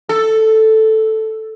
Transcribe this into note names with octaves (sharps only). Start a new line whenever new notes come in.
A4